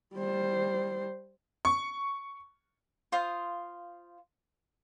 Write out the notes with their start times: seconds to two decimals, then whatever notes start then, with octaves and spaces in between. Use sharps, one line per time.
0.14 G3 C5
1.65 C#6
3.12 F4 C5 F5 D#6